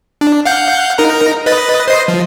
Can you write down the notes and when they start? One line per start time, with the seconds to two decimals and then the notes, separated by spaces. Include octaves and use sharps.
0.21 D4
0.45 F5 F#5 G6
0.98 D#4 A#4 A#5
1.46 B4 D#5 A6
1.88 C5 D#5 C7
2.08 F3